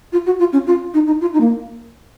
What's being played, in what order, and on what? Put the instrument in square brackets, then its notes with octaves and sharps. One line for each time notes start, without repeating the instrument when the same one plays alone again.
[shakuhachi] F4
F#4
F4
C#4
F4
D#4
D#4
F4
D#4
A#3